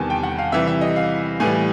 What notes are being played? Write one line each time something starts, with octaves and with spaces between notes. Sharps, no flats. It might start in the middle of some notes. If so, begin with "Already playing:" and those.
Already playing: E2 C3 D#3 G3 B3 G#5 A5
G5
F#5
F5
C3 E3 G3 E5
E5
D#5
F5
A2 E3 G3 G#5